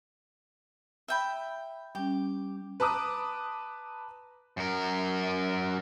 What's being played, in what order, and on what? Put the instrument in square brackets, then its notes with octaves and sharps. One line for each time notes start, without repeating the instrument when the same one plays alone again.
[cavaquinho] E5 G5 B5
[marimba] G3 C#4 [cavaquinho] G4
[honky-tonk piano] B4 A5 A#5 D6 D#6 F#6
[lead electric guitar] F#2 A#4